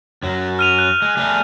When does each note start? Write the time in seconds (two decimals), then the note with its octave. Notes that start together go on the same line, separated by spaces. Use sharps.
0.23 F#2 F#3
0.59 F6 D#7 F7
0.79 F#6
1.02 G#3
1.17 G3 A3 G#4